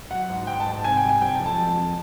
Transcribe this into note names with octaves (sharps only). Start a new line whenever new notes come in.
F#3 F#5
G#2
G#2 G5
A5
G#2
A5
C3 G#5
G5
G3
G#5
C3 G5
A5
F2
A5
F2
F2